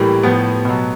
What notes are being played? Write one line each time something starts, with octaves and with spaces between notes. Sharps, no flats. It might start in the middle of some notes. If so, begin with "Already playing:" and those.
Already playing: A2 E3 G3 A#3
A2 F3 B3
B2 F#3